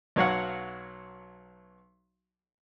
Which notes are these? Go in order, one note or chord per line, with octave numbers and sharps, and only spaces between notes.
B1 F#3 C#5 F5 F#5